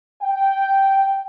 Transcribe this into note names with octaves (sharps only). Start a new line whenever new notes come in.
G5